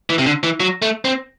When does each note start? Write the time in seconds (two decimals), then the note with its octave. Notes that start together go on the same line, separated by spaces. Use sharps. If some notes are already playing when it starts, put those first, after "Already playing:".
0.10 E3
0.19 C3
0.26 D3
0.43 E3
0.60 F#3
0.82 A3
1.05 C4